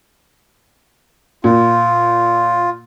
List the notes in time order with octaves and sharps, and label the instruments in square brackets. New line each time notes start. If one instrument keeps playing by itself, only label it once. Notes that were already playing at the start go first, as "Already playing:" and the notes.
[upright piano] A#2 [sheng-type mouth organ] F4